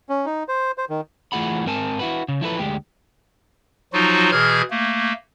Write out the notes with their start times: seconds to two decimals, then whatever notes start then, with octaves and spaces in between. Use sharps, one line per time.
0.09 C#4
0.26 D#4
0.48 C5
0.78 C5
0.90 D#3
1.32 E3 A3 F4 G#4 F#5 B5
1.66 G#2 C4 A#4 G#5 A5
1.99 E4 F#4 B4
2.28 C#3
2.41 F3 E4 A4 B4
2.59 D2 G#3 G4
3.93 F3 F#3 D#4 F4 F#4
4.32 B2 E3 G#4 F6 G6 G#6
4.70 A3 A#3